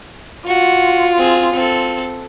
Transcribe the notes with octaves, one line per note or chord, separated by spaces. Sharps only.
F4 F#4
C4 G#4
C4 A4